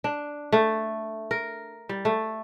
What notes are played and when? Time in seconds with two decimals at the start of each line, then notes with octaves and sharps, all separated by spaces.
0.04 D4
0.52 A3
1.31 A#4
1.89 G3
2.05 A3